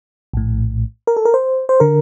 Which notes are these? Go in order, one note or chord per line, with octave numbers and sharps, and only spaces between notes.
A#1 A2
A#4
A4
A#4
C5
C5
D3 A#4